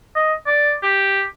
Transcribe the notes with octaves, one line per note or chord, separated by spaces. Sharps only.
D#5
D5
G4